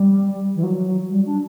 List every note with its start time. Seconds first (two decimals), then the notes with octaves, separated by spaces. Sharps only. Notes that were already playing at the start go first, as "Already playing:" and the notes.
Already playing: G3
0.55 E3
0.63 F#3
1.10 G3
1.26 D4